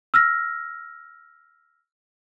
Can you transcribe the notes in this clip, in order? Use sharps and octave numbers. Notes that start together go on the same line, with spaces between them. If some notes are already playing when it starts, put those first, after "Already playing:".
E6 F6 A#6